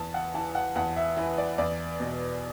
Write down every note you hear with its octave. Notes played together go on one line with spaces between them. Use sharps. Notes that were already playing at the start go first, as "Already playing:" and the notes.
Already playing: E2 A5
F#5
E3 A5
F#5
E2 F#5
E5
E3 B4
D5
E2 D5
B2